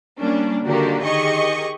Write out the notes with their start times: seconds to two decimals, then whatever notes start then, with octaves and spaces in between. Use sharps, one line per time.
0.18 G3 A#3 C#4 D4
0.65 D3 D#3 A#3 D4 F#4 G4
1.02 D#3 G4 G#4 D#5 C#6